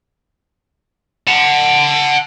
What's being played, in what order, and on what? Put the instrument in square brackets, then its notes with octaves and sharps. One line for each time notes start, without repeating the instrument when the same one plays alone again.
[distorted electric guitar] F#5 A5